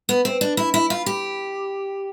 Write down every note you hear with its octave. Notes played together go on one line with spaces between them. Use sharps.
B3
C4
D4
E4
E4
F4
G4